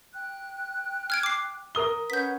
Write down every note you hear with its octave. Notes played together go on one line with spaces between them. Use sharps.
G5 F#6
F6 G#6 D7
D6 C7
A#4 D#6 G7
C#4 B4 F#5 G6 B6